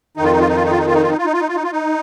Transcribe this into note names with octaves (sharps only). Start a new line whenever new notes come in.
F2 D#3 D#4
F4
D#4
F4
D#4
F4
D#4
F4
D#4
F4
D#4
F4
D#4
F4
D#4
F4
D#4
F4
D#4
F4
D#4